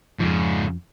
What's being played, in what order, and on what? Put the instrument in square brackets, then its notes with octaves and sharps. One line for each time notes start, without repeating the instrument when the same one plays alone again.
[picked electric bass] F2 F3 [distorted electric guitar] G#2 C#3